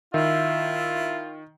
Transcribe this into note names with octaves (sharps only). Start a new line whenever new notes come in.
D#3 E4 F4 E5